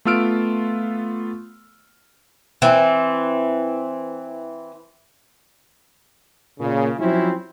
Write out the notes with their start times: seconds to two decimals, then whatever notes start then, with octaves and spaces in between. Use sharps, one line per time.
0.05 A3 B3 F4 E6 F6 D7
2.62 E3 C4
6.59 A#2 C#3
6.99 F3 F#3 C4 C#4 E4